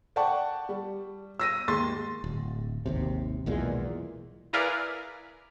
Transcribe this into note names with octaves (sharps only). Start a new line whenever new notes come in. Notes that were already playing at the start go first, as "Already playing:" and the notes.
D5 F#5 G5 A5 C#6
G3
E6 A#6 D#7
D#2 G#2 C6 A6
D1
G#1 D#2 C3
B1 E2 A#2 G#3
E4 G#4 A#4 B4 D5 F5